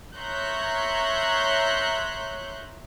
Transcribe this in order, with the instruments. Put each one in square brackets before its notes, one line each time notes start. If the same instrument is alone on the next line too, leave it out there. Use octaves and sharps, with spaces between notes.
[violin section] C#5 E5 A#5 C6 F#6 G6